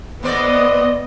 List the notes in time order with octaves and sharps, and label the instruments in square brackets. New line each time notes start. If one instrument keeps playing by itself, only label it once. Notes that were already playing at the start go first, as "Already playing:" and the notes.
[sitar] A2 C5 D5 [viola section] B3 D#5